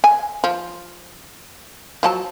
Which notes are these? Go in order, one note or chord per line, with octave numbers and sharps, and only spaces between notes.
G#5
F3
F3 F#3 A5